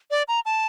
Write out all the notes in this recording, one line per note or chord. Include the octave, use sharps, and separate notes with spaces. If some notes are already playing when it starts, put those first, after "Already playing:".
D5
A#5
A5